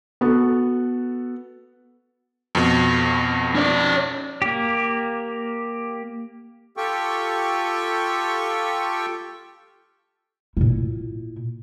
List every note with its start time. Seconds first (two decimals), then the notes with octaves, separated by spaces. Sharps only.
0.21 B3 F#4 A4
2.55 F2 B2
3.55 C#4 D5
4.42 A#3 G4
6.77 F4 G4 A4 G5 C#6
10.57 A#2 E4